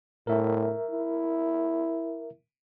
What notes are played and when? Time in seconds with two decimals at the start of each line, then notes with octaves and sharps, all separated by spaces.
0.27 A2 A#4 E5
0.90 E4